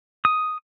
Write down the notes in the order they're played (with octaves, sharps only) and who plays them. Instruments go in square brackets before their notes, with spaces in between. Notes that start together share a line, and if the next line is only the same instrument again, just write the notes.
[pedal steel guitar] D#6